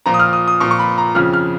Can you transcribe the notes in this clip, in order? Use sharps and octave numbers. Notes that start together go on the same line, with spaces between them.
A#2 F3 A#5
D#6
F6
D#6
D#6
A#2 F3 C#6
C#6
B5
A#5
F2 C#3 F3 F6
F6